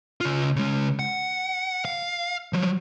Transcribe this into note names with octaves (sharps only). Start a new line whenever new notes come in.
C#3 F4
C#3 G#3
F#5
F5
F3 F#3